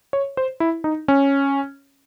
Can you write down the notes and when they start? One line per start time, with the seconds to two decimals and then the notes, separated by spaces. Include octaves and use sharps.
0.13 C#5
0.37 C5
0.60 E4
0.84 D#4
1.08 C#4